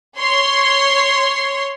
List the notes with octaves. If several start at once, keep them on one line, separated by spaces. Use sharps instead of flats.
C#5 C6